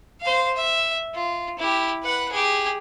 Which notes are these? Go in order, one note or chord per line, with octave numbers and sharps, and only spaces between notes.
C5 F5
E5
F4
E4 G4
B4 F#5
G4 G#4